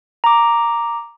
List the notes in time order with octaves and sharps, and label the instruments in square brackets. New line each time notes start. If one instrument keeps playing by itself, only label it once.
[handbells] A#5 D6